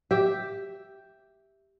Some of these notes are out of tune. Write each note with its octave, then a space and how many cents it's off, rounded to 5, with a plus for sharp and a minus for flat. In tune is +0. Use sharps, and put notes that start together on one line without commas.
G4 +0 E5 +0